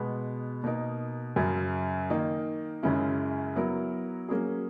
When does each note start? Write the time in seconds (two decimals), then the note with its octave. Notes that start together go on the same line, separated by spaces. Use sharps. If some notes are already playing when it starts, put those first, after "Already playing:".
Already playing: B2 G#3 B3
0.64 B2 A#3 D#4 A#4
1.36 F#2 C#3 F#3
2.10 D#3 A#3 D#4
2.83 F#2 C#3 G#3 C#4 E4
3.56 F#3 B3 E4 A#4
4.29 F#3 A#3 C#4 G#4